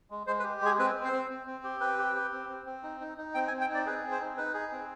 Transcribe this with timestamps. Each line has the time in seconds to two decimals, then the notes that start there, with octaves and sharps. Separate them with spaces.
0.10 G#3
0.27 G#3 C5
0.40 B4
0.44 G4
0.61 G#3 G#4
0.79 C4 B4
0.95 C4
1.04 C5
1.13 C4
1.30 C4
1.47 C4
1.64 G4
1.81 C4 B4
1.99 G4
2.15 G4
2.32 C4
2.49 C4
2.66 C4
2.83 D#4
3.01 D#4
3.18 D#4
3.34 C4 G5
3.48 G#5
3.52 C4
3.61 G5
3.69 D#4 D5
3.86 G#4 B4
4.03 C4
4.11 C5
4.20 D#4
4.37 D#4 B4
4.54 G#4
4.72 C4